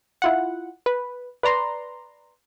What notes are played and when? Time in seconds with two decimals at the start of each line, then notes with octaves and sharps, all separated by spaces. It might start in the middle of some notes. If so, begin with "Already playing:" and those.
0.22 E4 F4 F#5
0.86 B4
1.43 B4 D5 A#5 C6